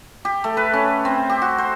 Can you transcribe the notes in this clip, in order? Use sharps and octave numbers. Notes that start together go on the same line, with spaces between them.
G4
A3
B4
C#4
C4
G4
F#4
C5